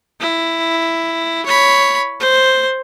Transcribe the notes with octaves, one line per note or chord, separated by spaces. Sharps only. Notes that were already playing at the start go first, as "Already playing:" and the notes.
E4
C#5 B5
C5